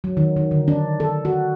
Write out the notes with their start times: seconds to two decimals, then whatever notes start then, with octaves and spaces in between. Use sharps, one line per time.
0.04 F#3
0.17 D#3
0.36 D#3
0.51 D3
0.68 D4
1.00 A4
1.25 F#4